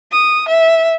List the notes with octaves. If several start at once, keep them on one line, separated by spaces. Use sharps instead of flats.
D#6
E5